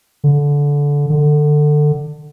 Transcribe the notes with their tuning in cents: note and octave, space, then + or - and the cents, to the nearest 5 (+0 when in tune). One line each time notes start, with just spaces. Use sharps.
D3 -20
D3 +20